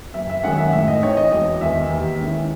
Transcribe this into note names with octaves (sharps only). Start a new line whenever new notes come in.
F#1 E5
E5
F#2 D#3 G#3 C#4 F#5
E5
A2 E5
D#5
E3 C4 D#4 C#5
D#5
E1 D#5
E2 D#3 E5
D#2
D#3 G#3 C#4 E4